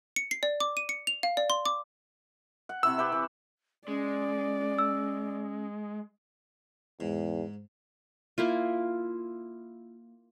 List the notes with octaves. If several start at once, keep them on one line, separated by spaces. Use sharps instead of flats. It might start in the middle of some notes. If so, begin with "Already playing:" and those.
C#7
C7
D5
D6
D#7
C#7
F7
F5
D5
C6
D6
F#5
C3 E4 C#6 E6
G4 B4 E5
E3
G#3 C#4 D5
E6
E2 G#2
A#3 E4 F4